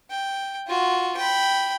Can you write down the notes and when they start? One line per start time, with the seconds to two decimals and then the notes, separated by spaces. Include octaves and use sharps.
0.10 G5
0.67 F4 F#4
1.17 G5 B5